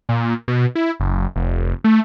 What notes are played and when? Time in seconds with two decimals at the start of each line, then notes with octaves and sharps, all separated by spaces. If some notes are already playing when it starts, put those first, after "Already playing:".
0.09 A#2
0.48 B2
0.75 E4
1.00 F#1
1.36 F1
1.84 A3